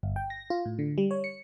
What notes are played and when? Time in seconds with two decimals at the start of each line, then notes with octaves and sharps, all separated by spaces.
0.03 G1
0.16 G5
0.30 A#6
0.50 F4
0.65 A2
0.79 D3
0.98 G3
1.11 C#5
1.24 C#7